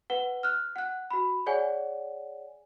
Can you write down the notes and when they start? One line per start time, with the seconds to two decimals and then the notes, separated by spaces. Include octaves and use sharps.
0.10 B4 F#5 G7
0.43 F6 F#6
0.76 F#5 F#6
1.11 F#4 B5
1.46 G#4 C#5 D5 F#5 G#5